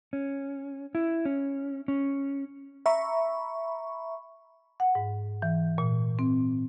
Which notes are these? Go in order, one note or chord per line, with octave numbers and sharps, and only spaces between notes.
C#4
E4
C#4
C#4
E5 A#5 B5 C#6
F#5
G#2
E3
A#2
C4